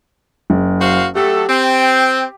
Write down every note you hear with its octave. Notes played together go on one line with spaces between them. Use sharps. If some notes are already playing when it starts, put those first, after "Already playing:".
F#1
F#4 C5 F5
F#3 A3 G4 A4
C4 G5